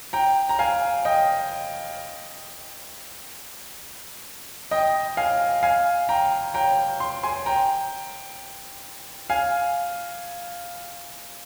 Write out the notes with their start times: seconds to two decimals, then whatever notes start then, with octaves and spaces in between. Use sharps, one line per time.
0.13 G5 A#5
0.49 A#5
0.59 F5 G#5
1.05 D#5 G5
4.71 D#5 G5
5.17 F5 G#5
5.63 F5 G#5
6.09 G5 A#5
6.54 G5 A#5
7.00 C6
7.23 G#5 C6
7.46 G5 A#5
9.30 F5 G#5